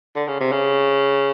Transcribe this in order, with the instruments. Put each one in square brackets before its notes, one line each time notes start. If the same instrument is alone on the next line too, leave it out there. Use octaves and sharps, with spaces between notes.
[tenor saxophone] D3
C#3
C3
C#3